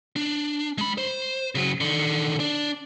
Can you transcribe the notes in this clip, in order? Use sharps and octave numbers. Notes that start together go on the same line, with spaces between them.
D4
G#3 B5
C5
C#3 F#3
D3 D#3
D4